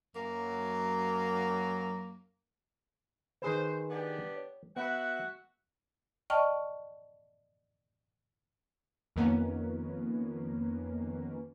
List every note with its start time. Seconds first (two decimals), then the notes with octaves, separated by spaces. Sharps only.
0.15 F#2 F#3 A#3
3.42 D#3 G#4 B4 C5
3.90 B3 D4 G4
4.36 C#5
4.76 B3 F#4 B4 E5 F#5
6.30 D5 D#5 G5 A5 C#6 F6
9.16 F2 D#3 A#3 B3 C#4